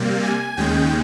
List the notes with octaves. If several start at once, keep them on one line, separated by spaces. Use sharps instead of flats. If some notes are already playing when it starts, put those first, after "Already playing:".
Already playing: C3 G3 A#3
G#5
D#2 C#3 G#3 G5